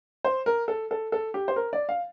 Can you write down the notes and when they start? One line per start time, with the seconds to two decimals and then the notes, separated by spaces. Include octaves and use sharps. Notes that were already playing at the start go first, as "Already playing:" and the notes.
0.24 C5
0.46 A#4
0.68 A4
0.91 A4
1.12 A4
1.34 G4
1.48 C5
1.56 A#4
1.73 D5
1.89 F5